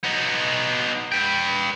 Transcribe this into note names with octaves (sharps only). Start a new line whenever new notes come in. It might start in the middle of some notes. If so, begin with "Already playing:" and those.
B3 D#4
B4 G5